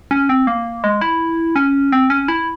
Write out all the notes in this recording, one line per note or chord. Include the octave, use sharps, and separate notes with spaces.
C#4
C4
A#3
G#3
E4
C#4
C4
C#4
E4